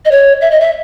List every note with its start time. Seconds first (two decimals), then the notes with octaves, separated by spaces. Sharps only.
0.05 D#5
0.11 C#5
0.41 E5
0.51 D#5
0.60 E5